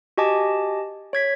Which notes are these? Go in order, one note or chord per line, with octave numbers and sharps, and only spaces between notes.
F#4 G4 D#5 G#5 A5 D6
C#5 G#6 B6